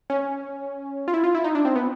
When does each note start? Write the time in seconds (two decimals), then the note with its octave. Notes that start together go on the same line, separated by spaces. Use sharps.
0.10 C#4
1.08 F4
1.14 E4
1.24 F4
1.35 E4
1.44 D#4
1.55 D4
1.65 C4
1.76 B3